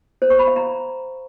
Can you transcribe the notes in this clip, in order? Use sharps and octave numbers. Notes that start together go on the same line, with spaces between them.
C5
C#6
B5
F5
A#5